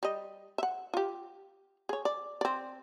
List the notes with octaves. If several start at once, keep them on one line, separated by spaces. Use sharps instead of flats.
G3 D#5
E5 F#5
F4 G4
G#4 C#5
D5
C4 D5